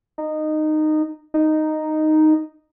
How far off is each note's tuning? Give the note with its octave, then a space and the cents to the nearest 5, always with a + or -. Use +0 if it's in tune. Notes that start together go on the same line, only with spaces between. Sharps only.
D#4 -15
D#4 -5